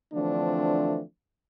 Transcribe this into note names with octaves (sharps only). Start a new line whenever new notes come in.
D3 E3 F3 A3 C4 D4